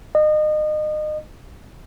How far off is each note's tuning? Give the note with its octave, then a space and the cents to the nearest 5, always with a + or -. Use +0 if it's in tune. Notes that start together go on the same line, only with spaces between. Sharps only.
D#5 -30